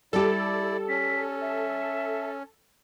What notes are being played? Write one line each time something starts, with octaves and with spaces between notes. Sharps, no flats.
G3 E4 G4 A4 D5
C#4 B6
E5